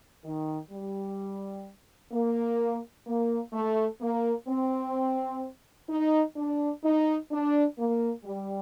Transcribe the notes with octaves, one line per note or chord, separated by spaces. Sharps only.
D#3
G3
A#3
A#3
A3
A#3
C4
D#4
D4
D#4
D4
A#3
G3